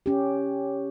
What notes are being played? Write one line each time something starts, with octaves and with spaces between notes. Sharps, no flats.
C#4 G4